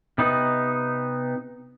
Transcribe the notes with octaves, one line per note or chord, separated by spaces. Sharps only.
C3 B3 D#4